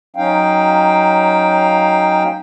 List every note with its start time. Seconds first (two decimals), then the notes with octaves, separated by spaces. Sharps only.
0.16 F#3 C#4 D#4 F5 G5